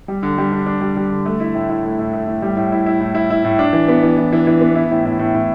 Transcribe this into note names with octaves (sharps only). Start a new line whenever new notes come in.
G3
D3
G3
D4
D4
G3
G3
D3
A3
E4
A2
E4
A3
A2
A3
A2
G3
A2
E4
E4
A2
E4
E4
A2
D4
E3
B3
E3
E3
E3
E3
B3
E4
A2
A2
A2
A2